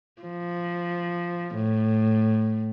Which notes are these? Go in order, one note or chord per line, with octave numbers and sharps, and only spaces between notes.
F3
A2